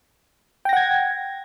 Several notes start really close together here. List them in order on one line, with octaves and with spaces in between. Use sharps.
G5 A#6 F#5 G#6